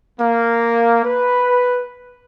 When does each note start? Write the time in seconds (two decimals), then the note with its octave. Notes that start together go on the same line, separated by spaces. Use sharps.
0.19 A#3
1.04 B4